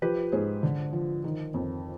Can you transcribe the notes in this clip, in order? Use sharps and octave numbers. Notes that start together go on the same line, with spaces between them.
F3 G4 B4
G#2 G#4 C5
D3
F3
D#3
F2